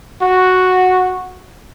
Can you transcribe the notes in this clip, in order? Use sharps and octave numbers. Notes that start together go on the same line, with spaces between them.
F#4